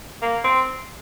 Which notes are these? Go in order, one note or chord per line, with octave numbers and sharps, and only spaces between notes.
A#3
C4